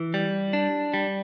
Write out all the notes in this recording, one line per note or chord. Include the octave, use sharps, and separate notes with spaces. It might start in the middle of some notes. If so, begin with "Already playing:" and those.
Already playing: E3
G3
D4
G3